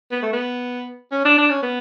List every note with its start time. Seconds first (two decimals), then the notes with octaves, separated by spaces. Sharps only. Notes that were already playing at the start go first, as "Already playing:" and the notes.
0.12 B3
0.22 A3
0.33 B3
1.12 C#4
1.25 D4
1.38 D4
1.50 C#4
1.63 B3